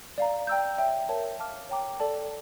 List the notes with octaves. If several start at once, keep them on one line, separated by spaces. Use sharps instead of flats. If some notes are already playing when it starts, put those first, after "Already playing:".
D5 F5 A#5
D5 G5 A#5 E6 G6
C#5 E5 G5
A#4 C#5 E5 A5
F5 A5 D6 F6
C#5 G5 A#5 D6
A4 D5 A5